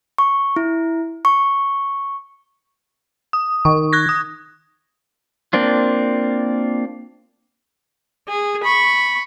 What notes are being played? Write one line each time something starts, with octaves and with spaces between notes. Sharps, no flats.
C#6
E4
C#6
D#6
D#3 C#6
F#6 G#6 A#6
D#6
A#3 C4 D4 F4
G#4
B5 C#6